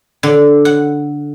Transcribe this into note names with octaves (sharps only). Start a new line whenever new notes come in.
D3
F#5